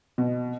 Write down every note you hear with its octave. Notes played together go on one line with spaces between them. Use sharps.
B2